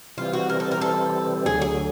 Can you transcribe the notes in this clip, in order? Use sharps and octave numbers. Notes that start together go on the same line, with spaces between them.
C3 E3 G3 C4 F4
F#4
A#4
A4
A#4
A4
D2 D3 F#3 G#4
G#4